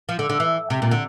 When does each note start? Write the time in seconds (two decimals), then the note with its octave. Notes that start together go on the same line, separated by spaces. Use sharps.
0.09 F3
0.19 D3
0.29 D3
0.40 E3
0.70 C3
0.82 A#2
0.91 D3